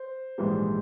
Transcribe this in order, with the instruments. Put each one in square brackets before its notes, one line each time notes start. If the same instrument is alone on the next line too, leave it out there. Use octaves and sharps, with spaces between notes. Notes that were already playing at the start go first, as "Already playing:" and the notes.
Already playing: [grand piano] C5
A#1 G#2 E3 G3